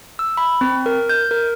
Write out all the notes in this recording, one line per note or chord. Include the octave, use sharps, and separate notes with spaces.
E6
B5
C4
A#4
G6
A#4